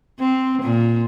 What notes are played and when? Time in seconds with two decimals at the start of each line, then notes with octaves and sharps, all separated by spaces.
0.19 C4
0.63 A#2